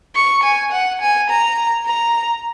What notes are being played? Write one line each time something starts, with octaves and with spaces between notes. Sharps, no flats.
C#6
G#5
F#5
G#5
A#5
A#5